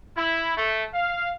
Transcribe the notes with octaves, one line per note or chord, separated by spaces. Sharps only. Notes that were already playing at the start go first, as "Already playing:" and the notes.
E4
A3
F5